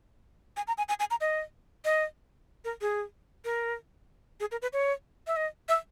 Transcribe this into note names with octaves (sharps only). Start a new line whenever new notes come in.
G#5
A#5
G#5
G#5
G#5
A#5
D#5
D#5
A#4
G#4
A#4
G#4
A#4
B4
C#5
E5
D#5
E5